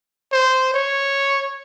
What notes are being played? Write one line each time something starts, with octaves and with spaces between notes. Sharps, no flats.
C5
C#5